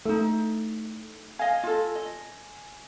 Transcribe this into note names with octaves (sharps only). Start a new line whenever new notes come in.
A3 D#4 E4
D#5 F5 G#5
F4 A4
D#5